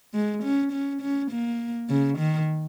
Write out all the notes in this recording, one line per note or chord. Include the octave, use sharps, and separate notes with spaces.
G#3
C#4
C#4
C#4
A#3
C#3
D#3